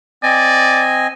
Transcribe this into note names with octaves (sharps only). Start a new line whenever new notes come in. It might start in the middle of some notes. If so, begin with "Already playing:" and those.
C4 D5 D#5 G#5